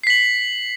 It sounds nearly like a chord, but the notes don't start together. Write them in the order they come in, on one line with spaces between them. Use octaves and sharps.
C7 B6 F#7